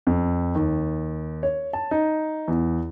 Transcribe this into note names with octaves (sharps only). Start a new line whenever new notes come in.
F2
D#2
C#5
A5
D#4
E2